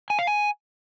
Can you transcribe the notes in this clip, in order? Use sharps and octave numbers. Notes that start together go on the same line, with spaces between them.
G#5
F5
G#5